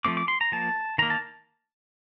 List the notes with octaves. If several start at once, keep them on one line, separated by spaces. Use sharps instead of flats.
F3 A3 C4 D6
D6
C6
A#5
F3 A#3 A5
D#3 A#3 A#5
A5